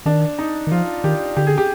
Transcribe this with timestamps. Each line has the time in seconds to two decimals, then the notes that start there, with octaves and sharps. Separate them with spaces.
0.06 D#3 D4
0.39 D#4
0.67 D#3
0.71 F3 F4
1.04 D#3 G4
1.37 D3 G4
1.47 G#4
1.58 G4